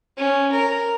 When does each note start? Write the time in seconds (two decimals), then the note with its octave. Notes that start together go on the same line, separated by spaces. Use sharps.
0.17 C#4
0.52 A#4